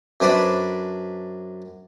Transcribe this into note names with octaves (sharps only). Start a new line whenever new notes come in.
F#2 D4 B4 C5 D5 B5